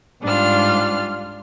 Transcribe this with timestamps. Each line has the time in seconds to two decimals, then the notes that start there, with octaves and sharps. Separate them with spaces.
0.23 G#2 G3 D4 F4 F6